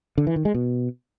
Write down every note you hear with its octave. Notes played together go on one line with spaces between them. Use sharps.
D3
E3
D#3
G#3
B2